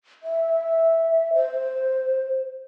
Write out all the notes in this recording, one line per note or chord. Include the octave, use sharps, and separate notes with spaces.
E5
C5